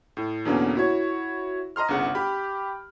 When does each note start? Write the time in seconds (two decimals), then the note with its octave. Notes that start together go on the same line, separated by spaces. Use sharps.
0.17 A2
0.45 E2 B2 D3 A#3 B3 C#4
0.75 E4 F#4 C#5
1.76 D#5 A#5 C6 F6
1.88 G1 C2 C#3 F#5 F#6
2.15 G4 B5